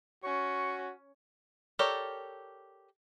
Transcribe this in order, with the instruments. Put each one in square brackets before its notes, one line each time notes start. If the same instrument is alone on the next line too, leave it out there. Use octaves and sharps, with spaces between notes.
[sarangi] C#4 [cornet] F#4 [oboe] C#6
[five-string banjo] G4 A4 A#4 C#5 D5